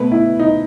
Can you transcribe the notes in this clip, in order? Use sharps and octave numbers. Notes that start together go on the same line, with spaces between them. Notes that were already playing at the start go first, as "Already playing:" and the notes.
Already playing: B2 A3 B4
E4
D#4